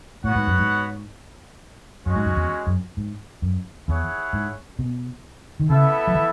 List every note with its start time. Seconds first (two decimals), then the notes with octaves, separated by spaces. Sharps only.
0.24 A2 B3 F#4 C#5 F#5
0.36 G#2
0.47 F#2
0.58 G#2
2.06 F#2 G#3 C#4 F#4
2.16 G#2
2.26 F#2
2.36 E2
2.67 F#2
2.97 G#2
3.42 F#2
3.88 E2 E4 G#4 C#5 F#5
4.33 G#2
4.79 B2
5.60 D#3
5.69 C#3 B3 E4 A4 E5
6.07 F#3
6.15 E3